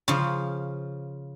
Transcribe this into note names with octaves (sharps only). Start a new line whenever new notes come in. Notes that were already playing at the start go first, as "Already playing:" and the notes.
C#3 F3